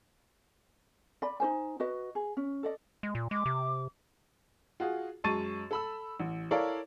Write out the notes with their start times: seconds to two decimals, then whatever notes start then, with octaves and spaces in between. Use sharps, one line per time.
1.22 D5 B5
1.40 D#4 F#4 C5 G#5
1.80 F#4 B4 D#5
2.15 G#4
2.37 C#4
2.63 A4 D5 D#5
3.03 G#3
3.15 A#2
3.31 G#3 D6
3.46 C3
4.80 F4 F#4 G#4
5.24 F#2 G#3 A5 C#6 A6 D#7
5.71 A4 B5 E6
6.20 A1
6.51 E4 A4 A#4 C#5 D5 F5